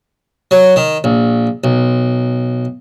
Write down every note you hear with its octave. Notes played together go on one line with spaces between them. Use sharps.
F#3
D#3
A#1
B1